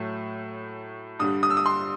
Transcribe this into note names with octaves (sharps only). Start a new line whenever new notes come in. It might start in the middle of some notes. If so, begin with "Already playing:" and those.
Already playing: A2 F#3 A3
G2 D3 G3 D#6
D#6
E6
D#6
C6